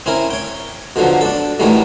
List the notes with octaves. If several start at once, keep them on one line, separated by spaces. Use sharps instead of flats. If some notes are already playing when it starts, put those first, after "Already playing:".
C4 C#4 E4 A#4
C#5 G5
B2 D3 F3 F#3
D4 A4
A2 D#3 E3 F#3 G3 A3